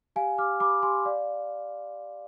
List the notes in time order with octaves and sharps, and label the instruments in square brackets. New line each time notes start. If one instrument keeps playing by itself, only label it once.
[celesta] G4 F5 G#5
G4 D6 F6
G4 B5 D6
G4 G#5 C6
D5 F5